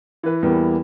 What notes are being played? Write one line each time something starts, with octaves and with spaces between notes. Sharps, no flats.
E3 B4
E2 E3 G3 A#3 B3